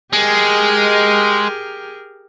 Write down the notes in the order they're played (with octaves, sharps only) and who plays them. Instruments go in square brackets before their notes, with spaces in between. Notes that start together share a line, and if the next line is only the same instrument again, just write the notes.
[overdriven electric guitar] G#3 [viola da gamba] G4 G#4 A#4